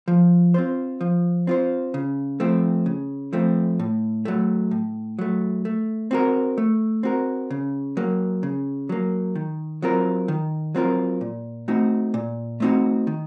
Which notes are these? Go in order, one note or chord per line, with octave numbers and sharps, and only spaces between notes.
F3
C4 F4 C5
F3
C4 F4 C5
C#3
F3 A3 C4
C#3
F3 A3 C4
A2
F#3 A3
A2
F#3 A3
A3
C4 F#4 A#4
A3
C4 F#4 A#4
C#3
F#3 A#3
C#3
F#3 A#3
D#3
F#3 C4 F4 A#4
D#3
F#3 C4 F4 A#4
A#2
A3 C4 D#4 F#4
A#2
A3 C4 D#4 F#4
D#3